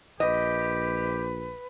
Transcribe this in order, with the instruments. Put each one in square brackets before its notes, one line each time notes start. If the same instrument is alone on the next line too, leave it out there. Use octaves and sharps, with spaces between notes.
[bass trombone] A#1 [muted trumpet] G4 [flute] B4 [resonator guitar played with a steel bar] D#5